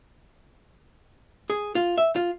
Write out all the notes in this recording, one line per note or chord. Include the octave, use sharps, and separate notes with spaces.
G#4
F4
E5
F4